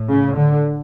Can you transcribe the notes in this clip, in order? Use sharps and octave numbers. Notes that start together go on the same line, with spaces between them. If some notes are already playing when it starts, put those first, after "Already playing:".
Already playing: A2
C#3
D3